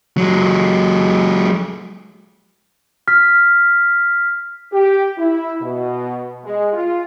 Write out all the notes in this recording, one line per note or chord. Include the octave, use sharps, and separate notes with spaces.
F#3 G#3
F6 B6
G4
E4
B2
G#3
F4